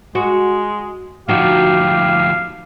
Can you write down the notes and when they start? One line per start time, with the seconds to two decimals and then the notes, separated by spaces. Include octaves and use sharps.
0.15 G#3 F#4
1.28 D2 F3 D#4 F#4 G4 F5